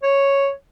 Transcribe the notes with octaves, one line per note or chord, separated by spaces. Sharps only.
C#5